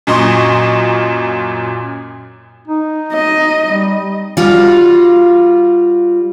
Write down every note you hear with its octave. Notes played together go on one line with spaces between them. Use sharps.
F#2 A#2 D#5 C6 C#6
D#4
D#5
G3
G3 F4 F#4